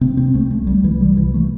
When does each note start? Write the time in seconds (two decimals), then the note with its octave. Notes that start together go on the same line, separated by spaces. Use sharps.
0.01 C3 C4
0.17 C4
0.34 C2 A3
0.51 A3
0.67 C2 G3
0.84 E3
1.00 C3 G3
1.17 E3
1.34 A3